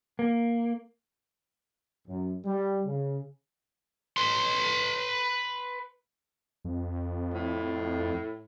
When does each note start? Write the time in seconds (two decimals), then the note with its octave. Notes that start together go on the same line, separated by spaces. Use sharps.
0.19 A#3
2.07 F#2
2.45 G3
2.85 C#3
4.17 B4 C6
6.65 F2
7.34 A2